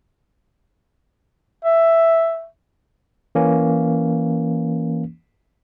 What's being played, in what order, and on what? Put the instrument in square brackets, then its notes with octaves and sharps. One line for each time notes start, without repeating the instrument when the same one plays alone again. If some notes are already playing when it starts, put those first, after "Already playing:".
[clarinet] E5
[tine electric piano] E3 A#3 C#4